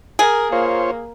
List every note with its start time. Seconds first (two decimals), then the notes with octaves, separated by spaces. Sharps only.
0.19 G#4 A#4
0.52 A#3 F4 C5 C#5